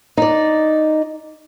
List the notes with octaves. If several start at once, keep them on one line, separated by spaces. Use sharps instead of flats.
D#4 D5